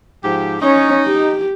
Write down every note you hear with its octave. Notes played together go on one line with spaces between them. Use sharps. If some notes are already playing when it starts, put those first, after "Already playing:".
G#2 F3 G4
C#4 D#4 C#5
G4